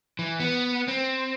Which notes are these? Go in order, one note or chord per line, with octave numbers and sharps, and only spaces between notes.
E3
B3
C4